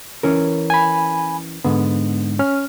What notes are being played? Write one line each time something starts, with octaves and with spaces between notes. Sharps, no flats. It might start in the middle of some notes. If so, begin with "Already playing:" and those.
E3 C#4 A#4
G#5 B5
G#2 D3 B3
C#4 F6